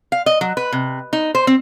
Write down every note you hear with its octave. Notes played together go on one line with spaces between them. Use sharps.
F5
D#5
F#3
B4
C3
D#4
C5
C4